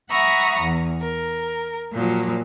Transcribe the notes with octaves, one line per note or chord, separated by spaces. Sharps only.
E5 F#5 A#5 B5 C#6 D#6
E2
A#4
A#2 F3 F#3